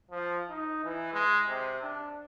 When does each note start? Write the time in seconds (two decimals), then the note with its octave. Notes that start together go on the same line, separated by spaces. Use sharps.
0.11 F3
0.49 D#4
0.84 E3
1.13 G#3
1.48 C3
1.82 D4